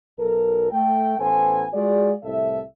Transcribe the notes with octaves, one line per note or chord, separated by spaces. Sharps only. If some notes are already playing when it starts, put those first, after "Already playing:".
B1 A4 A#4
A3 G5
A1 B3 A4 C5 G#5
G#3 F4 F#4 G#4 D5
C2 A2 A4 E5